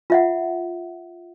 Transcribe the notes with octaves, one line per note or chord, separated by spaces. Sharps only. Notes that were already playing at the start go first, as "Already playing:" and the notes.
F4 E5 F#5